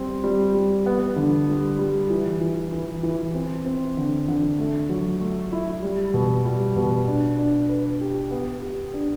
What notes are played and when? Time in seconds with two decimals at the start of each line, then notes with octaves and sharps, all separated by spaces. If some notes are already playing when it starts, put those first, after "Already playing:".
Already playing: G3 C4
0.24 G3
0.54 G3
0.86 B3
1.16 D3
1.48 G3
1.79 G3
2.10 E3
2.41 E3
2.72 E3
3.03 E3
3.35 C4
3.66 C4
3.97 D3
4.28 D3
4.59 A3
4.89 F#3
5.21 A3
5.53 E4
5.82 G3
6.14 B2
6.45 G3
6.76 B2
7.08 D4
7.39 D4
7.69 B4
8.01 G4
8.31 B3
8.62 G4
8.94 D4